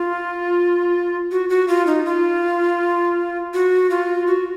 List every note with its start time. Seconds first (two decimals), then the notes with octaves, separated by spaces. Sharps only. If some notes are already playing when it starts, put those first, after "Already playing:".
Already playing: F4
1.31 F#4
1.49 F#4
1.68 F4
1.87 D#4
2.05 F4
3.54 F#4
3.90 F4
4.27 F#4